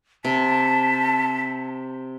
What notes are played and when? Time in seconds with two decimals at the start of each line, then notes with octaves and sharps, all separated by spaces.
0.25 C3 A5 B6